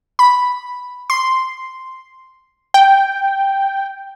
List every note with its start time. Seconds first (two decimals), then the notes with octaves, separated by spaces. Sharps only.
0.19 B5
1.10 C6
2.74 G5